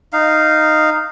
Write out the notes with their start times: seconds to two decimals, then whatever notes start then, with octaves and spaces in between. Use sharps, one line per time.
0.13 D#4 F5